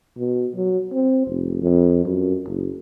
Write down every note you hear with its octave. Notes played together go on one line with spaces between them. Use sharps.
B2
F#3
C4
F1
F2
F#2
F#1